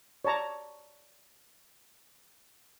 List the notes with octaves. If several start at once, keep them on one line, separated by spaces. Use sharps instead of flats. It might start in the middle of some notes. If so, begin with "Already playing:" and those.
C#5 D5 A5 A#5